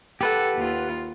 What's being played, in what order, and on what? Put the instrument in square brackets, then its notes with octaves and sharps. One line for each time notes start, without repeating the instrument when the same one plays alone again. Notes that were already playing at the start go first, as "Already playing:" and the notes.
[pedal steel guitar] G4 B4 F#5 [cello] A4
[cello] D#2 F4